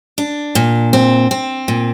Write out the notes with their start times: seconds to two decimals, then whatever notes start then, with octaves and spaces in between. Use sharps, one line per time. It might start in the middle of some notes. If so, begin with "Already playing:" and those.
0.18 D4
0.55 A#2
0.93 C4
1.31 C4
1.68 A#2